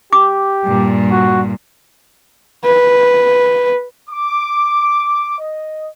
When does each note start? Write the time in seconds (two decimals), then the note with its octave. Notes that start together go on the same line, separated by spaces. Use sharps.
0.13 G4 D6
0.64 G2 A#2
1.11 F#4
2.65 B4
4.09 D6
5.38 D#5